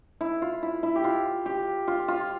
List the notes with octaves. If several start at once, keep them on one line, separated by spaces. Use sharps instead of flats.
E4
F4
E4
E4
G4
F4
G4
F4
F4